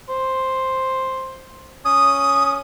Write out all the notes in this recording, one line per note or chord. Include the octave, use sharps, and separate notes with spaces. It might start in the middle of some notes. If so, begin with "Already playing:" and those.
C5
C#4 D#6